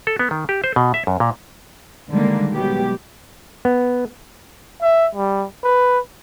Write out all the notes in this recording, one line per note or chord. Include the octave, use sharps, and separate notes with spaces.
A4
B3
D#3
G4
C5
B2
E5
F#2
A#2
D3 D#3 G3 G#3 A#3
B2 F#3 G#3 B3 G4
B3
E5
G3
B4